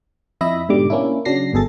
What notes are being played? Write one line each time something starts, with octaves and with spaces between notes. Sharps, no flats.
F2 E4 D#5 E5 B5 A#6
G#2 B2 D3 G3 D6
A#3 C#4 D4 E4
C#3 F#3 D4 A#6 C7
G1 B2 G#4 A4 A6